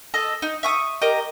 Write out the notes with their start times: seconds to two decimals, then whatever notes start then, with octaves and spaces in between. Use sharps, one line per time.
0.14 A4 D#5
0.42 D#4
0.63 E5 C#6 D#6
1.02 G4 A#4 D#5